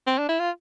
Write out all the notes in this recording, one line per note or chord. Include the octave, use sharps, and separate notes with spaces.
C4
D4
E4
F4